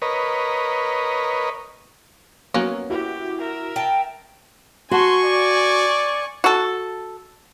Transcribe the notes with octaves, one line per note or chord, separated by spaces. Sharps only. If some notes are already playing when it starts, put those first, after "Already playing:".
A#4 B4 C#5 D#5
F#3 A#3 B3 C#4
E4 F#4 G4
A#4 E5
G5 A5
F#4 F#5 G#5 A5 C6 C#6
D5
F#4 A4